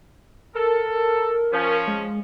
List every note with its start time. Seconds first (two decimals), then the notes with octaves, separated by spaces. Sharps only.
0.55 A4 A#4
1.52 F3 C#4
1.87 G#3